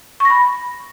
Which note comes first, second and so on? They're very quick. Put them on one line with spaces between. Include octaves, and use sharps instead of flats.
C#6 A#6 B5